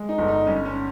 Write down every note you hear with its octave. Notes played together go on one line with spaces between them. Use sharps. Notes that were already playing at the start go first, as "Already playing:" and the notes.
Already playing: G#3
D#4
G1
D#4
G2 C#4
C#4